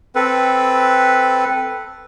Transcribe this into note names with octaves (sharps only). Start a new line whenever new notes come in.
C4 A4 B4